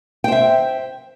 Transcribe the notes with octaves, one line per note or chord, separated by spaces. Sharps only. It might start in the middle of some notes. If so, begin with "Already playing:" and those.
C5 E5 G5